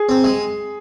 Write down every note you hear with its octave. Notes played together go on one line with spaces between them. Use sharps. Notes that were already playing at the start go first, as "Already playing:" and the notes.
Already playing: G#4
C4
G#3